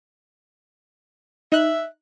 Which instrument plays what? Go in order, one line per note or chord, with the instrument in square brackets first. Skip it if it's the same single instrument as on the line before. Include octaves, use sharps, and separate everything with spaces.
[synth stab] D#4 F#6 [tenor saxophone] E5